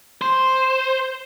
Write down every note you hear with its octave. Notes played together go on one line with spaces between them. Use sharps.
C5